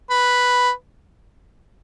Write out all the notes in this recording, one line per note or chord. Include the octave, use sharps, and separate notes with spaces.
B4